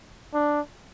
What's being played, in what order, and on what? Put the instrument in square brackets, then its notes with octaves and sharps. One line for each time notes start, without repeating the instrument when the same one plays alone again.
[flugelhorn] D4